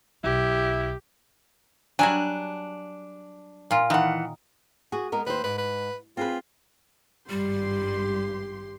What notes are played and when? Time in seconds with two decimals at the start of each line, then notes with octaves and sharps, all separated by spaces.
0.24 B1 E4 G4
1.99 F#3 G3 D4 F#4 G#5
3.71 A#2 F4
3.90 D#3 E3 F#5
4.92 F#4 G#4
5.12 G#3 B3 A#4
5.26 D#2 B4 C5
5.44 G#2 B4
5.58 B4
6.17 C4 F4 G#4 B4
7.30 G#1 G2 G3 G4 C6